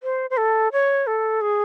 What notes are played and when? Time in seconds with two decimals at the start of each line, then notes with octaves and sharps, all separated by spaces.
0.03 C5
0.30 C5
0.37 A4
0.72 C#5
1.07 A4
1.41 G#4